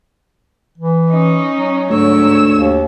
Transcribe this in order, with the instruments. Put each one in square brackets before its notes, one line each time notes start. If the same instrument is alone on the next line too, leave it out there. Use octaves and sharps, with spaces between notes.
[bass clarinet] E3
[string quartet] C#4 D#4
[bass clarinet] F#3
[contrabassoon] D2 [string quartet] G#2 C#5 E6
[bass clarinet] D#2